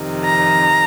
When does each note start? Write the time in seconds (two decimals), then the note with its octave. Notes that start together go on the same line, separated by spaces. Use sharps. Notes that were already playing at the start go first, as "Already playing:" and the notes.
Already playing: F2 C3 D#3
0.25 A#5